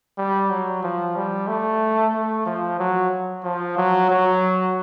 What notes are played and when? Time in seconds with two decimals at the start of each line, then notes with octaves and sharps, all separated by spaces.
0.18 G3
0.50 F#3
0.83 F3
1.16 G3
1.48 A3
2.14 A3
2.46 F3
2.79 F#3
3.44 F3
3.77 F#3
4.10 F#3